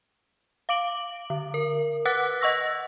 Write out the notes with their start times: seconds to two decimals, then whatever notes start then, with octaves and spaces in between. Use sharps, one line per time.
0.69 F5 D6 D7 F#7
1.30 D3
1.54 A#4
2.05 B4 F#5 D6 F#6 A6 B6
2.41 D#5 F#5 C#6 E6 A#6